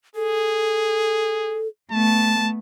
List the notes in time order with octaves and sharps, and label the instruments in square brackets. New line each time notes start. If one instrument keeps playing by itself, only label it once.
[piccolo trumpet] G#4 [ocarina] A4
[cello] A3 B3 [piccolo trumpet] A5